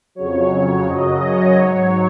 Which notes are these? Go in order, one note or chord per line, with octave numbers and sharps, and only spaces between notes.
F2 C#3 F#3 C#5
C#5
F#2 C#3 F#3 D#5
C#5
G#2 F#3 C#5